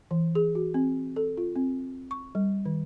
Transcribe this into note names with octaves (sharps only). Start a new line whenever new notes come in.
E3
G#4
F#4
C4
A4
F4
C4
C#6
G3
D#3